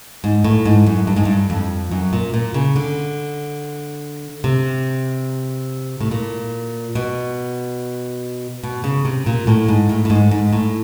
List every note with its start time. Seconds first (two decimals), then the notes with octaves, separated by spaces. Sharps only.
0.24 G#2
0.44 A2
0.65 G#2
0.86 F#2
1.07 G2
1.16 G#2
1.25 G2
1.50 F2
1.91 F#2
2.13 A#2
2.34 A#2
2.54 C#3
2.76 D3
4.44 C3
6.01 A2
6.11 A#2
6.95 B2
8.63 B2
8.84 C#3
9.05 C3
9.26 A#2
9.47 A2
9.68 G#2
9.89 A2
10.05 A2
10.10 G#2
10.31 G#2
10.53 A2